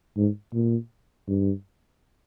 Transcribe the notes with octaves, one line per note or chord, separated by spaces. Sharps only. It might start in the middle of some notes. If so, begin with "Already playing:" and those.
G#2
A#2
G2